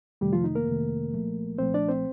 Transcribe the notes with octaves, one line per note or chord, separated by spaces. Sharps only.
F2 C3 D#3 G3 A3 G4
F3 F4
D#4
A#3 A#4
F2 C3 D#3 A3
C2 A#2 F3 A3
C2 A#2 F3 A3 C4 C5
D4 D5
C4 C5